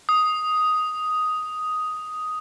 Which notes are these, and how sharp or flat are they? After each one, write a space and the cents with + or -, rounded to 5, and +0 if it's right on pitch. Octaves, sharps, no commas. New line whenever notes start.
D#6 +5